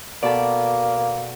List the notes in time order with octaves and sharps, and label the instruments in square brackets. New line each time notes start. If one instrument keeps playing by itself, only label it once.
[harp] B2 A4 [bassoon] A#3 [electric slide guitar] D5